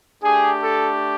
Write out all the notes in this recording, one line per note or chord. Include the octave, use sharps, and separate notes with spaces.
A3 D4 G4 G#4
A4